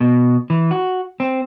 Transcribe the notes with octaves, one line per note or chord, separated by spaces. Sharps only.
B2
E3
F#4
C4